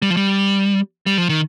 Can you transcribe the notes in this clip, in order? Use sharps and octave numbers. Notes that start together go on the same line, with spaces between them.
G3
F3
G3
G3
F3
D#3